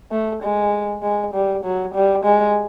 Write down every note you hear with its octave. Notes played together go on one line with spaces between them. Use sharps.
A3
G#3
G#3
G3
F#3
G3
G#3